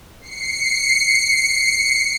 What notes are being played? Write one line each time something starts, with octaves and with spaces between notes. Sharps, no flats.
C7 C#7